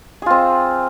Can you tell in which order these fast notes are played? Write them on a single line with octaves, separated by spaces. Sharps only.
G#4 F4 C4